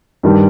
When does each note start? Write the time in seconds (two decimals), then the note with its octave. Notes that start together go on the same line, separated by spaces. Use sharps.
0.23 G2 D#3 G3